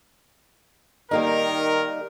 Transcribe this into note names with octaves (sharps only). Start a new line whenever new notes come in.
D#3 G3 A#3 D#4 A#4